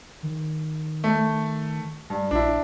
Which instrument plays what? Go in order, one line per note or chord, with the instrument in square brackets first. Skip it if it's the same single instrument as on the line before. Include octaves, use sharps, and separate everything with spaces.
[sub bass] D#3
[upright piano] A3
G2
[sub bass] A#1 [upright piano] D4 E4